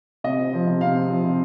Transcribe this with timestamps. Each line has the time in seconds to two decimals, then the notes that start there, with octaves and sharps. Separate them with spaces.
0.24 C3 D#5
0.39 C4
0.53 F3
0.67 C3
0.81 C3 F5
0.96 C4
1.10 F3
1.24 C3